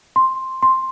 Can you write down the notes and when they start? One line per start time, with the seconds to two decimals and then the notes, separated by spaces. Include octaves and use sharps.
0.16 C6
0.63 C6